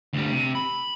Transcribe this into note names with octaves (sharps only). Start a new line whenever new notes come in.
D2 G3
C3
B5